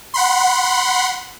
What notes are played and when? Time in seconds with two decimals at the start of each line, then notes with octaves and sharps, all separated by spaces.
0.14 F#5 B5 C6